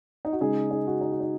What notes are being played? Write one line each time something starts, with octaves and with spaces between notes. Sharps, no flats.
D#4
F#4
C#3 G#3 D#4 G#4
D#4 G#4
F#4
D#4
F#4
D#4